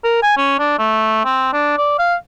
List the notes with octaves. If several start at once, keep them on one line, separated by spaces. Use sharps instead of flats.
A#4
G#5
C#4
D4
A3
C4
D4
D5
F5